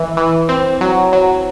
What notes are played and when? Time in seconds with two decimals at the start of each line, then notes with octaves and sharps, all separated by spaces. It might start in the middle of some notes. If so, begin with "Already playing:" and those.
Already playing: E3
0.17 E3
0.49 C4
0.81 F#3
1.13 F#3